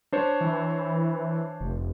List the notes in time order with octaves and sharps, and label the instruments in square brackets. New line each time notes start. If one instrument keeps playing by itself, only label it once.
[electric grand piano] D4 C5 C#5
[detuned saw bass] E3
F1